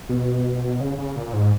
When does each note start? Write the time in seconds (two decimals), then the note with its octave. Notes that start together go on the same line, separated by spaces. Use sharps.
0.09 B2
0.80 C#3
0.98 C#3
1.16 A#2
1.33 G#2